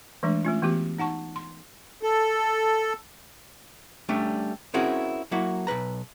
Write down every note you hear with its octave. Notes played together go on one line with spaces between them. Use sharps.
E3 G#3 A3 D4
A3 C#4 F4
E3 B3 F#4 G4
D#4 F#5 A5 C#6
C6
A4
G3 A3 C#4 D4
C4 C#4 E4 F#4 G#4 A#4
F#3 A#3 E4 F#4
B1 A#2 B4 A#5